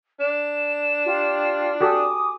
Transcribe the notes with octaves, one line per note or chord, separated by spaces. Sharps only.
D4 E7
F4 G4
F#4 G4 A4 G#5 D6 D#6